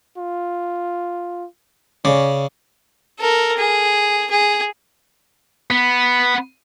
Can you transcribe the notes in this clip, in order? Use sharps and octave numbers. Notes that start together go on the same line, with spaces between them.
F4
C#3 C#4 D5
A4 A#4
G#4
G#4
B3